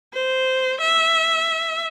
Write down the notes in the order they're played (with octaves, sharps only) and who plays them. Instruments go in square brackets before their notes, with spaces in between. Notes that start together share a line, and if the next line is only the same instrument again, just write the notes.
[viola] C5
E5